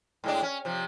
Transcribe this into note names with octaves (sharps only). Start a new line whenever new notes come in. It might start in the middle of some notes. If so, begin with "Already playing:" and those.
A2 G#3 D4
C#4
C3 F3